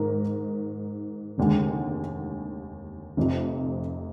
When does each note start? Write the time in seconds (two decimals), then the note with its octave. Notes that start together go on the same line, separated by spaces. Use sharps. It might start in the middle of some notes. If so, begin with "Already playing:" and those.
Already playing: G#2 D#3 D#4 A#4
1.38 F1 D#2 D3 G#3
3.17 F1 F2 C3